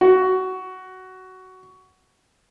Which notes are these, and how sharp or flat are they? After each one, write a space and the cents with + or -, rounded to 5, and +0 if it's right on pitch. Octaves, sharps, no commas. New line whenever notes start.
F#4 +15